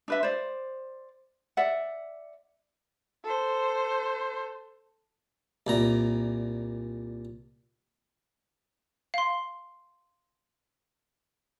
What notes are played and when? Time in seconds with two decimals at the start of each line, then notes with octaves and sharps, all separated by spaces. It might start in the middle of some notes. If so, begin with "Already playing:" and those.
0.08 D4 B4 E5
0.23 C5 D5
1.57 D5 E5 F#5
3.24 A4 C5
5.67 C2 A#2 A#5
9.14 F5 C6